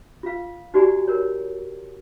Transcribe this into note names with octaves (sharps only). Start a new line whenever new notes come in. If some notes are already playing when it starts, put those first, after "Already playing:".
F4 F5
D#4 F#4 G4 D5 G#5 A#5
A#4 C#5